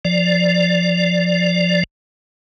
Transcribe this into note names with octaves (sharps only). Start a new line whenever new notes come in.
F3 D5